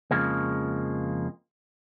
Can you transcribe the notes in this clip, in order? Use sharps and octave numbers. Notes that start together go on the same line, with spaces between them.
F2 C#3 F3 G#3 A#3